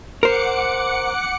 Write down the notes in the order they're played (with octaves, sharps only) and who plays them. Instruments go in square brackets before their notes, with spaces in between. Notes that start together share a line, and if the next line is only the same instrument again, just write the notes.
[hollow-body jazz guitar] A#4 C5 [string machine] F#5 D6 C#7